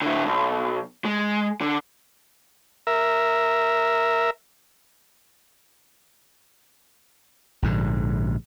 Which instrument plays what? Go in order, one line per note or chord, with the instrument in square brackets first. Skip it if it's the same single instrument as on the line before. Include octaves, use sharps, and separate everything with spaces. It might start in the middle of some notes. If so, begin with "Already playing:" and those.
[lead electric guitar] D3 E4
B1
G#3
D3
[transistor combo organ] A#4 E5
[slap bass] A#1 G#2 D3